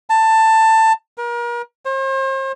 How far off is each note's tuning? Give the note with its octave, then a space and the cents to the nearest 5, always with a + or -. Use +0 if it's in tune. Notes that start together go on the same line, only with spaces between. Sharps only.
A5 +15
A#4 +35
C5 +40